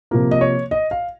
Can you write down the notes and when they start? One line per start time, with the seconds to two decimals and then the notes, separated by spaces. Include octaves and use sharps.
0.11 C3 F3 A#3 A#4
0.31 D#5
0.41 C#5
0.71 D#5
0.91 F5